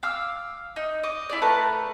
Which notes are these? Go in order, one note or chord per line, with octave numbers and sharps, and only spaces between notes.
F5 D6 E6 F6
D#4
D#5 D6
E4 F4 D5
A3 A#4 B4 A5